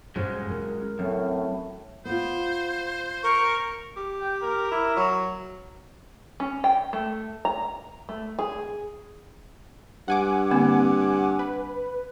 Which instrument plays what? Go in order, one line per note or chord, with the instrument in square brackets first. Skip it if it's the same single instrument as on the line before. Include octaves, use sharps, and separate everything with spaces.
[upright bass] G2 [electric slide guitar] F#3 G#3 C#4 [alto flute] C5
[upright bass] D#3 E4 [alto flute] A#4
[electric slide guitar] F#2 [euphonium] A2 [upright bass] C4
[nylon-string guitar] B3 F4 [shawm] C5
[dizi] A#4 [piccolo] C#6
[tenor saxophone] G4
[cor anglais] G5
A#4
[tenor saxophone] E4
F#3
[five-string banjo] C#4
G5
A3
A#5
A3
G#4
[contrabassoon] G2 [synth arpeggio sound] F#5 G#5 D6
[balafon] D3 A#3 C4
[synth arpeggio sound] B4